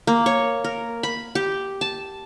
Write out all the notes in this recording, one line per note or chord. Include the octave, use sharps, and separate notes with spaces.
A#3
C#5
A#4
B5
G4
A5